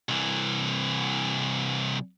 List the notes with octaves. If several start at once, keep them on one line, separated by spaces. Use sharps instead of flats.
C2 E3